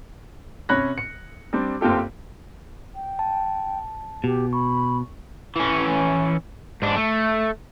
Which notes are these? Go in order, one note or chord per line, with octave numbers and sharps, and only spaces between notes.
C3 C#4 C#5 B5 F#6 A#6
C#7
G3 C4 D4
F#1 C4 F4 G4 A4
G5
A5
B2 G4
B5 C#6
E3 C#4
G#2 D4
A3